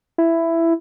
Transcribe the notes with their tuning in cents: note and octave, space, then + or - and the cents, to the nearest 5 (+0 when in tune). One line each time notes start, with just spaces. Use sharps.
E4 +10